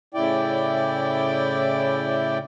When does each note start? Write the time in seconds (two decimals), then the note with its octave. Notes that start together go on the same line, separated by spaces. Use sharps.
0.14 A2 C#3 E4 D5 G5